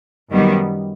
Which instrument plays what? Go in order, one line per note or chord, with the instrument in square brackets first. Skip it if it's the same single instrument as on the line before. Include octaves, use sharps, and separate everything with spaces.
[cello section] F#2 D#3 G3 B3